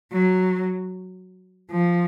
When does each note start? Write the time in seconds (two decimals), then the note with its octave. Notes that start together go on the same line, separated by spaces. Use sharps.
0.12 F#3
1.71 F3